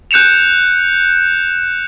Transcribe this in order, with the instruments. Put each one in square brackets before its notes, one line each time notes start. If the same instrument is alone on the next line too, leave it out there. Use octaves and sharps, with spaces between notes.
[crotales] F#6 G6 C#7 E7 F7